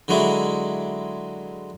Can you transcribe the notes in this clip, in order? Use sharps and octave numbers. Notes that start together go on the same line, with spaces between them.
D3 F#3 G#3 E4